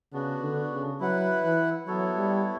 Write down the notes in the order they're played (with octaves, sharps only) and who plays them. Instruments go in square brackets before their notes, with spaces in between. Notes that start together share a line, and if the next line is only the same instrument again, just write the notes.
[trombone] C#3 [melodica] B3 D4 F#4
[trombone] D3
C#3
[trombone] F#3 [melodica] E4 B4 F#5
[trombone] E3
[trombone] F#3 [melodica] B3 E4 A4 C#5
[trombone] G3